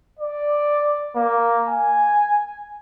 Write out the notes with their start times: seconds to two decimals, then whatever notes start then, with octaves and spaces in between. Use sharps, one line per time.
0.19 D5
1.16 A#3
1.68 G#5